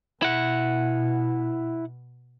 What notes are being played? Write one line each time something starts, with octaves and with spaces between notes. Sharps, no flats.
B2 E4 F#5